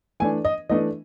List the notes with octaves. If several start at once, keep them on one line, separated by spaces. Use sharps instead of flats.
E3 A3 D4 G#5
D#5
E3 A3 D4 D#5